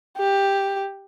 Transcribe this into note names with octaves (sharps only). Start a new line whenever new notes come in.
G4